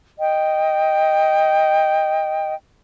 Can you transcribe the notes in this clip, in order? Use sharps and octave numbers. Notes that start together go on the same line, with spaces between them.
D#5 G5